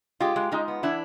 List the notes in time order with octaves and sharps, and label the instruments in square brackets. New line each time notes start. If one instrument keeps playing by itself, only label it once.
[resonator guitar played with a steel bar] G#3 F4 G4
G#3
G#3 D#4 F4
B3
E3 D4 E4